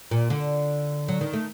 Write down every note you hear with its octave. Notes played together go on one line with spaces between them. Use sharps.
A#2
D3
F#3
D#3
A3